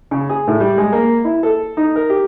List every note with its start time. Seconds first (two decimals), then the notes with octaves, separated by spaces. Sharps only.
0.11 C#3
0.29 G#4
0.47 A2
0.60 G3
0.78 G#3
0.92 A#3
1.25 E4
1.43 A4
1.77 D#4
1.96 A#4
2.10 G4